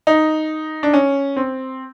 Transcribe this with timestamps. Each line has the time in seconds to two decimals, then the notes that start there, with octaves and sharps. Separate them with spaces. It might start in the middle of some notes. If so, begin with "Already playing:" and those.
0.07 D#4
0.83 D4
0.94 C#4
1.36 C4